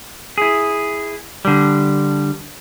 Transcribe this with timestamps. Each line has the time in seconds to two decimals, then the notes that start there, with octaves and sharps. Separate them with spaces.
0.38 E4 G#4
1.45 D3 G3